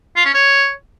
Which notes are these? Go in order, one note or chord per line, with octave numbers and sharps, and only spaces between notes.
F4
C#4
C#5